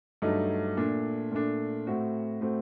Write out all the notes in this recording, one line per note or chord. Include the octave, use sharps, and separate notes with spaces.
G2 F#3 A3 D#4
A#2 A3 D4
A#2 A3 D4
A2 A3 C4 F#4
A2 A3 C4 F#4